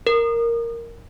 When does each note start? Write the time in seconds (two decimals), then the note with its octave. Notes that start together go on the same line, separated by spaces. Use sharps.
0.07 A#4